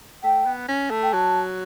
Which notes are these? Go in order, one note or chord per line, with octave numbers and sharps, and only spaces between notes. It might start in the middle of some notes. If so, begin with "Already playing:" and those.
A3 G5
B3
C#4
A3
G5
F#3 A5